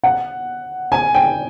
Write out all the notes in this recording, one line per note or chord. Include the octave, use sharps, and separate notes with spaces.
F#5
G#5
G5